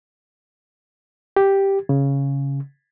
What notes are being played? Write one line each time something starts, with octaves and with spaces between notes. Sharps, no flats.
G4
C#3